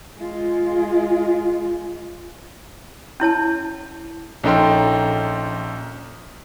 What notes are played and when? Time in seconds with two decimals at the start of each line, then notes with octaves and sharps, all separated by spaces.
0.18 G#3 F4
3.20 C#4 E4 C#5 A5
4.44 A#1 C#4 D#4 A4 G5 C6